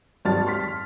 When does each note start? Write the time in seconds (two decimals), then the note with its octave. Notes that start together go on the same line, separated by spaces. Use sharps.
0.25 G#1 G3 A5 F6 A6
0.47 C6 F6 B6